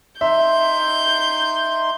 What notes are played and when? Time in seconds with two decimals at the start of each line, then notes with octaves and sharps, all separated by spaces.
0.21 D#4 E5 C6 G6